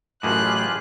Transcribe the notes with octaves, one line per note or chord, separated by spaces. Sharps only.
A1 F#2 A2 F4 G4 G#4 D#5 F#6